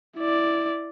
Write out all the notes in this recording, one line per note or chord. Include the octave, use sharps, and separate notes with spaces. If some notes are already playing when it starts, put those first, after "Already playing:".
E4 D5